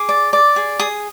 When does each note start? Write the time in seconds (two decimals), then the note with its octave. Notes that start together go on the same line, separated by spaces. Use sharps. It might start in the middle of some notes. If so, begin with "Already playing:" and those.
Already playing: G#4 D6
0.09 D5
0.33 D5
0.56 G#4
0.79 G#4 D#6